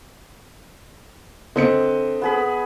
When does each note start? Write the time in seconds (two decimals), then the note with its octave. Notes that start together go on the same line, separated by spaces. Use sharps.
1.56 D3 C4 D#5 C#7
2.22 B3 G#4 B5